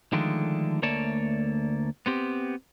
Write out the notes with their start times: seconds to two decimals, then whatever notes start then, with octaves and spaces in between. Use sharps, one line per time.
0.12 D3 D#3 F3 G#3 A3 D4
0.82 D2 A3 A#3 C#5 D5 A5
2.06 B3 C4 G4